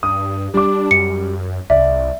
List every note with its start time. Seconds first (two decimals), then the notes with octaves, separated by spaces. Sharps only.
0.03 G2 D#6
0.54 G3 D4 D6
0.91 F#2 C#7
1.70 C2 D5 E5